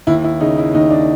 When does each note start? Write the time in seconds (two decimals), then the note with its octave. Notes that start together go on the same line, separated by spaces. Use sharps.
0.07 D#2 E4
0.24 E4
0.40 C#3 D#4
0.58 E4
0.74 D#2 D#4
0.91 D4